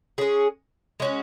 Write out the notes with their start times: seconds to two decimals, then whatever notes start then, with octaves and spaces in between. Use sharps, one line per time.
0.18 G#3 C#4 G#4
1.00 G#3 C#4 F#4